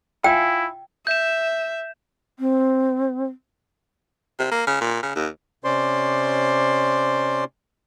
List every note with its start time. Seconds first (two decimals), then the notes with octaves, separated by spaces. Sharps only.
0.24 E4 F4 E5 G5 G#5
1.07 E5 G6 E7
2.39 C4
4.39 C3
4.51 A#3
4.67 C#3
4.81 A#2
5.03 C#3
5.15 D#2
5.64 C3 C#4 C5 D5 C6